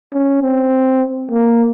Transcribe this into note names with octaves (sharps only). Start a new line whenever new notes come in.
C#4
C4
A#3